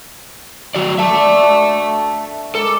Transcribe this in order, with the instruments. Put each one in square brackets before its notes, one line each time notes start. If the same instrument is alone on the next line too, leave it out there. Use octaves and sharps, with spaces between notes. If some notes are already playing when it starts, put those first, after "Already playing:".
[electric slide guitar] F#3 F#4 D5
[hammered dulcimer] D5 [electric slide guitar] E5 A5
[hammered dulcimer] D3
F#4
[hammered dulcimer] G#3 A#4 D6 [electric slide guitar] A4